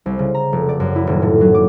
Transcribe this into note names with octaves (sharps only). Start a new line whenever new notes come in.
C2
C#3
A#5
F1
D5
F#2
E4
D#1
A2
F#3
D6